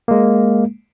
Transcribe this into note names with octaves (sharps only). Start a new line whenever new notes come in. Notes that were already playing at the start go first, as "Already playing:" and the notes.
G#3 A#3